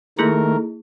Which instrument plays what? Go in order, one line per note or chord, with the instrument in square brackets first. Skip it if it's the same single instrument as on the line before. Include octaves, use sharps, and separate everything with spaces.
[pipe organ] D#3 A3 A#4 [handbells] A#3 E4 G#4